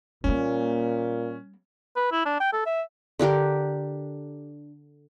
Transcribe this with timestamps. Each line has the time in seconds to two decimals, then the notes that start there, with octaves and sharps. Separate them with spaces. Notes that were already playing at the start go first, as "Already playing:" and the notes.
0.24 A#2 G3 A#3 C#4
1.96 B4
2.12 E4
2.25 D4
2.40 G5
2.53 A4
2.66 E5
3.19 D3 D4 G4 A#4